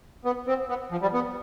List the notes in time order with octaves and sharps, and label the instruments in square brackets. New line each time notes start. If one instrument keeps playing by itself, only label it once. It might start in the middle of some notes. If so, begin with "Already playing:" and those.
[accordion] B3
C4
B3
F3
G3
B3